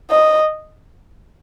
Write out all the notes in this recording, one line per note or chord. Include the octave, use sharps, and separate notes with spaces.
D#5